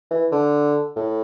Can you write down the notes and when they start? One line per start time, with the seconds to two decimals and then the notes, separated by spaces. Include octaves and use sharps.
0.11 E3
0.32 D3
0.96 A2